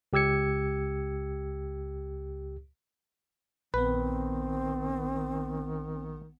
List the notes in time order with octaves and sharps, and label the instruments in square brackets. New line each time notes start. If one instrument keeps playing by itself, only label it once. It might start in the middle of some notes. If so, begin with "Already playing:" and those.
[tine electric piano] C#2 G4 E6 G#6 C#7
[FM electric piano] A#1 B3 [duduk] D#3 [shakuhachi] C4 [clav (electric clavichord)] B4